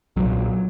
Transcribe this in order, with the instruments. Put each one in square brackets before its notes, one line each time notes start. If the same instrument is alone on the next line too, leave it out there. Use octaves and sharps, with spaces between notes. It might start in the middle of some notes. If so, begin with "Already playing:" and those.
[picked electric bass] B1 A#2 F#3